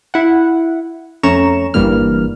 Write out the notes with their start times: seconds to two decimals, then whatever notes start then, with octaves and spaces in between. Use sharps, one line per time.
0.14 E4 F#5
1.23 F2 A3 C#4 A#5 C#6 E7
1.74 G1 G2 E3 G3 A#3 F6